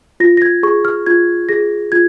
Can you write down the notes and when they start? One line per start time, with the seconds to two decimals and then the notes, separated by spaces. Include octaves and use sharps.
0.20 F4 A#6
0.37 A#6
0.42 G#6
0.63 G#4 C#6
0.85 F6
1.06 F4 G#6
1.49 G#4 A#6
1.92 F4 G#6